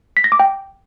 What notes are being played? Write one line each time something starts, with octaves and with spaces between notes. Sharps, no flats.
B6
A#6
D6
G5